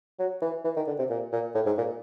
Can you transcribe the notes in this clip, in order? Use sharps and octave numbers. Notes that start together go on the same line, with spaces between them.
F#3
E3
E3
D#3
D3
C3
A#2
A#2
A2
G#2
A#2